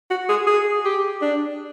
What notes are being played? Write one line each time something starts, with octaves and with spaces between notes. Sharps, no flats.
F#4
G#4
G#4
G4
D4